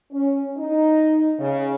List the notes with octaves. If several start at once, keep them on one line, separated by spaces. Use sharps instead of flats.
C#4
D#4
C#3